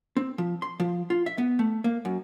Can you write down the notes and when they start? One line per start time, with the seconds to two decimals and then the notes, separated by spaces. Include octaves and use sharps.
0.17 C4
0.38 F3
0.62 C6
0.80 F3
1.10 F4
1.26 E5
1.38 B3
1.59 A3
1.84 A#3
2.05 F#2